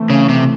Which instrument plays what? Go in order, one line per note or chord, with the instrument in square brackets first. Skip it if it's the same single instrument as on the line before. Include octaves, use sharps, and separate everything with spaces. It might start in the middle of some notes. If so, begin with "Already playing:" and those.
Already playing: [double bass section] E3 A3 C4
[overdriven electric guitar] C#3
C3